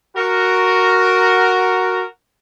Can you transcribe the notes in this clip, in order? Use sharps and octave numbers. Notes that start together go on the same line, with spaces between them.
F#4 A#4